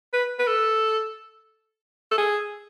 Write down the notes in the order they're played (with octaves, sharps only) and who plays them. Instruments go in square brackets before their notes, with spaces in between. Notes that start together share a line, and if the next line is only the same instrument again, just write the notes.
[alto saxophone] B4
B4
A4
A4
G#4